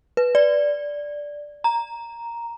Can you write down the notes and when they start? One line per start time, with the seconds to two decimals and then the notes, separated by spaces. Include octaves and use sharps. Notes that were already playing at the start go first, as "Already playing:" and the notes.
0.17 B4
0.35 D5
1.64 A#5